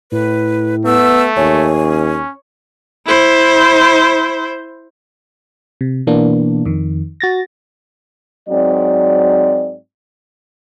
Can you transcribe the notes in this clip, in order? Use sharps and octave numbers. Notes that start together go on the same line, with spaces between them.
A2 B4
A3 B3 E6
D#2 C#5 G#5
C#4
E4 C5
C3
B2 E3 A#3 B3 D4
F2 D#3
F#4 A6 A#6
G#2 F#3 C4 D5